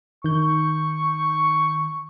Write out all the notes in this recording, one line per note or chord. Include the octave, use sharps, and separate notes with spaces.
D#3 C#6 G6